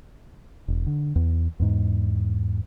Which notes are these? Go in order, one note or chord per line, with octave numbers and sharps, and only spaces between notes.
E1
D3
E2
E2 G#2